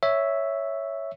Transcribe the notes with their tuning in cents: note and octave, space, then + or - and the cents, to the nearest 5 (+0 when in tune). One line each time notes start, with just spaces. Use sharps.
C#5 +0 E5 -5